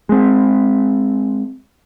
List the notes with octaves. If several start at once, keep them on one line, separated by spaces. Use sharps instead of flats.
G#3 C4